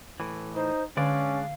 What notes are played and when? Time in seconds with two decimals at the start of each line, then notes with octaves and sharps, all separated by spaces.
0.20 A2 E3
0.56 D#4 C5
0.97 D3 G#3 C#4 D4 D5 F5